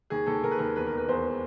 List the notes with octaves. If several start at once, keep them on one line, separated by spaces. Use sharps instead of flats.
D#2 G#4
D#2 A4
D#2 A#4
B4
D#2 A#4
E2 B4
A#4
E1
B4
E2 C5